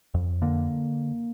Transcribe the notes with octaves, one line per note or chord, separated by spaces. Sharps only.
F2
D3 A#3